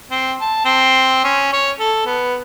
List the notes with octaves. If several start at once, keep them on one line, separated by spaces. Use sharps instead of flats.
C4
A5
C4
C#4
C#5
A4
B3